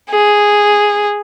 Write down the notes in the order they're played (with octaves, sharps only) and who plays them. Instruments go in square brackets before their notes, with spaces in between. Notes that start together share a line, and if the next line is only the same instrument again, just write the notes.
[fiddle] G#4